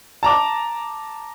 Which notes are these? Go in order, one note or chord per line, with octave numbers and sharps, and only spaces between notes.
A5 A#5 D6